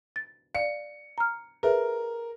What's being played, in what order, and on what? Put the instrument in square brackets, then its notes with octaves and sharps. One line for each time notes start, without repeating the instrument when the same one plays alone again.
[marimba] A6
[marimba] D5 F5 [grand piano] C#7
[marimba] A#5 F6
[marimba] G#4 B4 E5 [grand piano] A#4